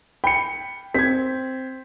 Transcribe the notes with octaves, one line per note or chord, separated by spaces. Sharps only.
G5 B5 C#7
C4 G#6 B6